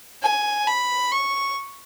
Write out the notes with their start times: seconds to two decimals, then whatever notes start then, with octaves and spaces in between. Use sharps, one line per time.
0.23 G#5
0.67 B5
1.12 C#6